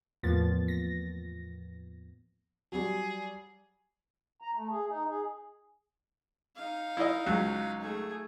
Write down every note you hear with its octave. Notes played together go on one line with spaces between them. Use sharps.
E2 A2 F3 A#3 B3 A6
A#6
F#3 G3 G#4
A#5
A3
G#4
D#4
G#4
D#4 F5
E4 D#5
C#2 F#3
A3 G#4